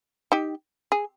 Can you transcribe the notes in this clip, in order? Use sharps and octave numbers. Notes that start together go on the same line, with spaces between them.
D#4 G4
G#4